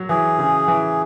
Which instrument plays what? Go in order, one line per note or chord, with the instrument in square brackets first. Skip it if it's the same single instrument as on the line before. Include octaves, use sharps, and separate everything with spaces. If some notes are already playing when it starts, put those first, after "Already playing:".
Already playing: [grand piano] F#3
[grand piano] E3 [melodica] G#4
[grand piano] C#3
E3